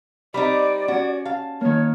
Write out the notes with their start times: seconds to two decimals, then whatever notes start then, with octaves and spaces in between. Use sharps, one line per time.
0.34 G3 C4 D#4 D5 B5
0.88 C#4 F#4
1.25 F5 A5
1.61 D#3 A#3 C#5